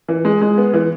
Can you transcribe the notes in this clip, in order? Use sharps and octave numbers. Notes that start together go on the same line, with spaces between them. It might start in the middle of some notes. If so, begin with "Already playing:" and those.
E3
G#3
G#3
B3
E3